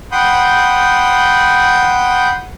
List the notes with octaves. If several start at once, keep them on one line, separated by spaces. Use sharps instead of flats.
F#5 G5 B5 C6 D#6 G6